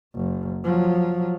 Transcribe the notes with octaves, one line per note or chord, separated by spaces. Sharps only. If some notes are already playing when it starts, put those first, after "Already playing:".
F#1
F3 F#3